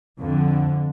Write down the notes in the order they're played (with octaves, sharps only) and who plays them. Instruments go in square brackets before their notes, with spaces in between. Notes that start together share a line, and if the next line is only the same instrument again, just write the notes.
[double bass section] F2 D3